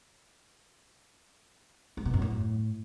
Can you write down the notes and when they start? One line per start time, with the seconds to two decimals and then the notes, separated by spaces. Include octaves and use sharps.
1.97 G#2
2.05 B2
2.14 F#2
2.22 A2